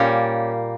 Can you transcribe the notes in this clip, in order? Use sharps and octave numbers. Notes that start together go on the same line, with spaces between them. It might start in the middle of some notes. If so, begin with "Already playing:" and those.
Already playing: A#2 G3 A#3 C#4